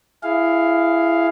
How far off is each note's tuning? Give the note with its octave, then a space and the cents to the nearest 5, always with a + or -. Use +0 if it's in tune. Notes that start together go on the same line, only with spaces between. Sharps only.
E4 +15 G#4 +0 F5 +0